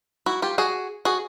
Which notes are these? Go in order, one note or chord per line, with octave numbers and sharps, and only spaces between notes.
E4 F#4
F4 G4
F#4 G#4
F#4 G#4